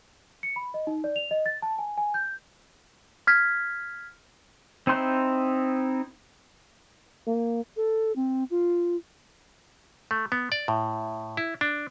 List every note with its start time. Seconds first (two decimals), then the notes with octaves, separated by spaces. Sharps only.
0.43 C#7
0.56 B5
0.74 D#5
0.87 D#4
1.04 D5
1.16 F7
1.31 D#5
1.46 A6
1.62 A5
1.79 G#5
1.98 G#5
2.14 G6
3.27 F6 G#6 B6
4.87 C4 D#4 E4 C6 G6
7.27 A#3
7.76 A4
8.16 C4
8.51 F4
10.11 A3
10.32 B3
10.52 D5
10.68 A2
11.37 E4
11.61 D4